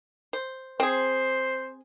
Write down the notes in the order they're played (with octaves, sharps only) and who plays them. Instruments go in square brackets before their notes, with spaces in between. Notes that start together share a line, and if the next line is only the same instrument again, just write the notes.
[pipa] C5
[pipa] C4 G#4 [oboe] C5